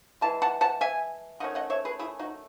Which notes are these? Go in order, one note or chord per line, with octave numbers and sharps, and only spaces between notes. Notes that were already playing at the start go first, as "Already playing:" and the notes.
E3 G#3 A5
F#5 A5
F#5 A5
E5 G#5
D#3 A3 C#4 D#5 F#5
D#5 F#5
C#5 E5
G#4 B4
E4 G#4
D#4 F#4